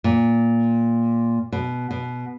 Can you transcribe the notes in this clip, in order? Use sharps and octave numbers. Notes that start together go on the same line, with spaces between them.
A#2
B2
B2